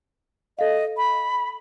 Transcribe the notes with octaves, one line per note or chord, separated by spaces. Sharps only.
A4 D#5 F5
B5